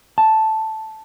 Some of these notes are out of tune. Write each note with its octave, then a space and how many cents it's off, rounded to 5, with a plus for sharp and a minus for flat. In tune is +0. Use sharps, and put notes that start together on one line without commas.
A5 -5